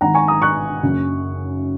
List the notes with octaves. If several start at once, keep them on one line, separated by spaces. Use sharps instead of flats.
G#1 G#2 D#3 F#5 A#5
G#5 C#6
A#5 D#6
C#6 F#6
F#1 F#2 C#3